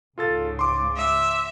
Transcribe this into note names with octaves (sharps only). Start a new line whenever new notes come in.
C#2 G#2 C#3 F4 A4 A6
C6 D6
E5